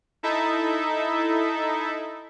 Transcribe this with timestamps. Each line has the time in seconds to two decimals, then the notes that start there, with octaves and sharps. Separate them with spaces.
0.23 D#4 E4 A4 E5